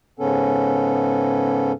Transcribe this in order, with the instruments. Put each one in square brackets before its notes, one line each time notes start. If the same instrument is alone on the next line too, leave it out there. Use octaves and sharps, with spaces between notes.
[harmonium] G#2 C#3 B3 C#4 A4